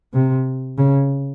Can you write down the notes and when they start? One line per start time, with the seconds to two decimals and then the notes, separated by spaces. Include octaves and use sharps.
0.13 C3
0.78 C#3